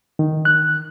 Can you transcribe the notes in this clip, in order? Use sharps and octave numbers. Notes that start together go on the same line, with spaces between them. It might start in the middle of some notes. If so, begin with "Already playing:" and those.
D#3
F#6